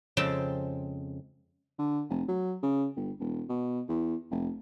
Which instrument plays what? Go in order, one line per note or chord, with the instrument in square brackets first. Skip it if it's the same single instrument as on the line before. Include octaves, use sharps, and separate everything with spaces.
[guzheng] F2 C#3 G#3 C4 G5 A5
[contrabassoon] D3
F1
F#3
C#3
G1
E1
B2
E2
F1